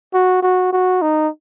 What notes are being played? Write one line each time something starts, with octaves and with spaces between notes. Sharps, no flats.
F#4
F#4
F#4
D#4